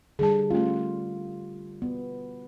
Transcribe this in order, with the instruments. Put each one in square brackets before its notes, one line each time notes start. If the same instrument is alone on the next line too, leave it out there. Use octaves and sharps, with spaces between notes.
[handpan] D3 G3 [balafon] G#4 A5
[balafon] A3 C#4 [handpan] F4
[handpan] B3